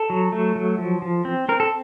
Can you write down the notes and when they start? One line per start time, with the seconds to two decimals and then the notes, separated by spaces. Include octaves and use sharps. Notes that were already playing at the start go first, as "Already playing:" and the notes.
Already playing: A4
0.10 F#3
0.32 A3
0.56 F#3
0.78 F3
1.02 F3
1.25 C4
1.49 C4 A#4
1.60 A4